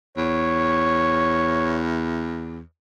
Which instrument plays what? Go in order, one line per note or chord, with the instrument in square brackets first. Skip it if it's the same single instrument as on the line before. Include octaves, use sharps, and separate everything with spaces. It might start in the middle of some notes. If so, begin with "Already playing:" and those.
[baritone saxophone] E2 [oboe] C#5